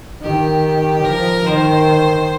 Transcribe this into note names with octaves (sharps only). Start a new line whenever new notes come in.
D#3 G4
F3 A#4
D#3 C5